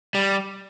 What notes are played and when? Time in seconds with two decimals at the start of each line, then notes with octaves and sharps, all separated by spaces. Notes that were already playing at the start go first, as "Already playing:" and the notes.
0.15 G3